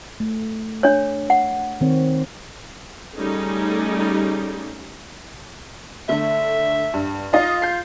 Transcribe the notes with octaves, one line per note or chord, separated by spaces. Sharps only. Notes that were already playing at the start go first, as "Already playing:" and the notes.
A3
D4 C#5
F#5
D#3 C4 C#5
G3 A3 C#4 D#4 G#4 A4
D3 A3 E5
G2
D#4 F4 D#5 F5
G6 C7